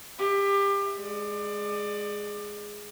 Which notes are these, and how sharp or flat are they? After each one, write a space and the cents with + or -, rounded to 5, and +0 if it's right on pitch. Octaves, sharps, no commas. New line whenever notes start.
G4 +25 E5 +0
G#3 +0 D5 +25